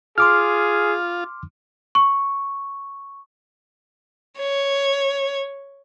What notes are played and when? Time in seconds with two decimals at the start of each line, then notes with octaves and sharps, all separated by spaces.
0.18 F4 G#4 C6 D6 F6
1.95 C#6
4.39 C#5